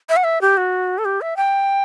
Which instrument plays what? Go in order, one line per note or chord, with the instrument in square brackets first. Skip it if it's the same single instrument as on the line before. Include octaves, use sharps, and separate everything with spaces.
[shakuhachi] E5
F#5
E5
G4
F#4
A4
G4
E5
G5